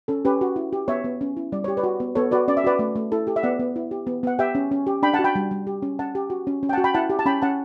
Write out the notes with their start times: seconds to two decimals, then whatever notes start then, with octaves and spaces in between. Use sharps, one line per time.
0.08 C#4 A4
0.25 C#4 G4 B4
0.41 F#4
0.56 E4
0.73 G4
0.88 B3 C#5 E5
1.04 B3
1.21 C#4
1.37 E4
1.52 G3 D5
1.64 G4 C#5
1.77 B4 D5
1.84 F#4
2.00 B3
2.15 B3 A4 C#5
2.31 F#4 B4 D5
2.48 C#4 D5
2.57 E5
2.64 F#4 B4 D5
2.79 A3
2.96 A3
3.12 E4 A4
3.27 G4 A4
3.36 E5
3.43 B3 D5 F#5
3.60 B3
3.76 E4
3.91 G4
4.07 B3
4.23 B3 F#5
4.39 G4 E5 G5
4.55 C#4
4.71 C#4
4.87 G4
5.03 D4 G5 B5
5.14 F#5 A5
5.19 F#4
5.24 G5 B5
5.35 G3
5.51 G3
5.67 G4
5.82 C#4
5.99 C#4 F#5 A5
6.15 G4
6.30 F#4
6.47 C#4
6.63 C#4
6.69 G5
6.73 F#4 F#5 A5
6.84 G5 B5
6.94 E4 F#5 A5
7.10 G4
7.19 A5
7.26 C#4 G5 B5
7.42 C#4 F#5 A5